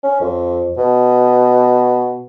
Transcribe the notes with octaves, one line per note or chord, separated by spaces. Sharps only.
C#4
F2
B2